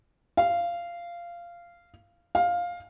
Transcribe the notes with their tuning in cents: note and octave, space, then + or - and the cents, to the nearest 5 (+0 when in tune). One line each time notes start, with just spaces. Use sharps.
F5 -15
F5 +10